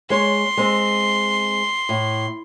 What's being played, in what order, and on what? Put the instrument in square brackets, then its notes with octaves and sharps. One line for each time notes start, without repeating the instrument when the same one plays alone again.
[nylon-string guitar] G#3 C#5 [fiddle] C6
[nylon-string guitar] G#3 C4
A2